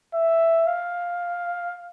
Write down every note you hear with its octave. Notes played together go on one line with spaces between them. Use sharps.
E5
F5